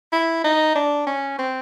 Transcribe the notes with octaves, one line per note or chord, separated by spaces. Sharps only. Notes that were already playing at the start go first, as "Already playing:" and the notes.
E4
D#4
D4
C#4
C4